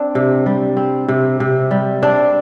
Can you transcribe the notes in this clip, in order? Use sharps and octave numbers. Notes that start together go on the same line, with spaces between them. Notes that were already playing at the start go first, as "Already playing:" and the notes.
Already playing: C4 D4
C3
G3
C4
C3
C3
G3
C4 D4